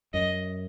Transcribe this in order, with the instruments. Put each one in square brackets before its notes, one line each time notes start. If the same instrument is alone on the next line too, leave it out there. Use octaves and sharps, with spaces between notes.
[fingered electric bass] F#2 [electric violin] D#5